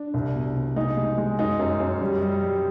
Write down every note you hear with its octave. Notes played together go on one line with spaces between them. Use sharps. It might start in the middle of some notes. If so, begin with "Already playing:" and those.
Already playing: D4
C2
B2
C2
G#3 D#4
G#3
G#3
F#2 D#4
F#2
F#2
G3
G3
G3